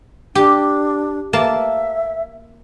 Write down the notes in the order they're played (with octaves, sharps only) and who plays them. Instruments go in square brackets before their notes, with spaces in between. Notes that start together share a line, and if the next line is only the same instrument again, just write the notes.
[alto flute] D4 [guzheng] G4
[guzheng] A#3 A5 [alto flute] E5